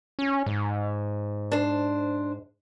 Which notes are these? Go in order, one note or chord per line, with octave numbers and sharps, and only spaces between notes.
C#4
G#2
D4 C5